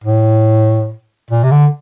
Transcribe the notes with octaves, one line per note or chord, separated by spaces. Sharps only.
A2
A#2
C3
D3